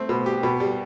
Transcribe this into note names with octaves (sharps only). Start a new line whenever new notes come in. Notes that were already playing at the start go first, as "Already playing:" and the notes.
Already playing: A3 C4
B2
G4
B2
G3